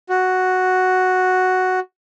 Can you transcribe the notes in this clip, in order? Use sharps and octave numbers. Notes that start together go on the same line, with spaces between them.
F#4